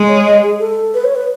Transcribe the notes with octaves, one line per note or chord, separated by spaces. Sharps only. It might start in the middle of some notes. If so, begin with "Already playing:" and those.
Already playing: G#3
C#5
D#5
G#4
A4
B4
C#5
B4